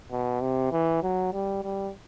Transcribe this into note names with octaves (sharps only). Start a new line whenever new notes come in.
B2
C3
E3
F#3
G3
G3